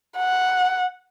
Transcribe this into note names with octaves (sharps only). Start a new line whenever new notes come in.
F#5